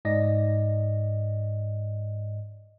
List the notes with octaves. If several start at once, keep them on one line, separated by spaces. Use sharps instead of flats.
G#2 D5 D#5 A#6